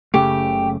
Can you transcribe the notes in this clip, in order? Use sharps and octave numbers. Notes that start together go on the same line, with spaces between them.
F#1 C#3 A3 G4